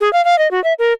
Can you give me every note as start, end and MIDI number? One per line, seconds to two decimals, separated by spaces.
0.01 0.11 68
0.13 0.24 77
0.25 0.38 77
0.39 0.50 75
0.51 0.63 66
0.64 0.73 76
0.79 0.93 70